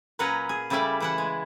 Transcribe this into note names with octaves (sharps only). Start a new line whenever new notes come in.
A#2 F#3 C#4 B4 F#5 A#5
G#4
C#3 G3 A3 E4 D5 E5
E3 E4 F#5
G#3